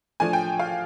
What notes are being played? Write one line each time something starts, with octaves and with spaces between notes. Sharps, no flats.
F3 A3 D4 G#5
G5
F5